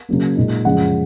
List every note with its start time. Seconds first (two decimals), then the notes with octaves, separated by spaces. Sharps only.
0.09 C#3 F#3 A#3
0.36 A#2 G#3 D#4
0.65 F#2 C#3 F3 G#3 C#4 F#5